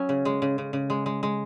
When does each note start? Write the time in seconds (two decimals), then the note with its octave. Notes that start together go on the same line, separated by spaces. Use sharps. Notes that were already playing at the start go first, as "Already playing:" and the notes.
Already playing: F#3 C#4
0.09 C#3
0.25 G#3
0.42 C#3
0.58 C#3
0.73 C#3
0.90 G#3
1.06 G#3
1.23 G#3